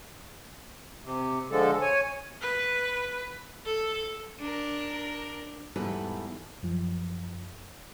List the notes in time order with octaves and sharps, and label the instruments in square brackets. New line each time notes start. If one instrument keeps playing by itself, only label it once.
[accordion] C3
D3 F3 G#3 A4
C#5 G#5
[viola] B4
A4
[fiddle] D4 A#4
[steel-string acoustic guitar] E2 G#2 G3 A4 B4
[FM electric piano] F#2 F3